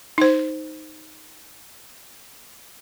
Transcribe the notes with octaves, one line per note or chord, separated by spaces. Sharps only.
D#4 C5